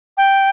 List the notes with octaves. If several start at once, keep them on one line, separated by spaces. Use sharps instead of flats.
G5